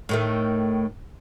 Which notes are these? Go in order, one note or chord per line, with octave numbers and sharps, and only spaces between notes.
A2 D#3 A3